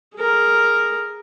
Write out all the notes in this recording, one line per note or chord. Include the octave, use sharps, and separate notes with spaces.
G#4 A#4